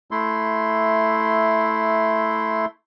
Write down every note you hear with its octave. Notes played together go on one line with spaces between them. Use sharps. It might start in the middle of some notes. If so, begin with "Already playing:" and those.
A3 E4 C6